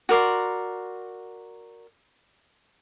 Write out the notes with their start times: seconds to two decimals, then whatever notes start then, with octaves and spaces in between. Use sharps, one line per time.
0.09 F#4 A#4 D5 C6